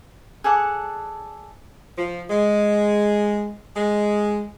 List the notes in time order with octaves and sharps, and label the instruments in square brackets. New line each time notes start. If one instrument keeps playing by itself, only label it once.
[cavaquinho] G#4 A4 D5 F#5
[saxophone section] F3
G#3
G#3